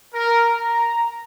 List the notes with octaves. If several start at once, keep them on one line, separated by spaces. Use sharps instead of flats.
A#4
A#5